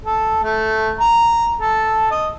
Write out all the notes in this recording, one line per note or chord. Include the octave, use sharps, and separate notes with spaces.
A4
A3
A#5
A4
D#5